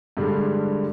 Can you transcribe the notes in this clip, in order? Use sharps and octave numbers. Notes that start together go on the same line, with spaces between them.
G2 D3 G3 G#3